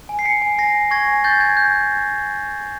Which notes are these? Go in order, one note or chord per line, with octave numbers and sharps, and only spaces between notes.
G#5
C7
G#5 B6 C#7
G#5
G#5 A#6 C7
G#5
C#6 G#6 A#6
G#5
C#6 G6 A6
G#5 G#6
G6